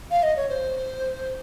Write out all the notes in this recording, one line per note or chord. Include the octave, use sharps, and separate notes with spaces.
F5
D#5
C#5
C5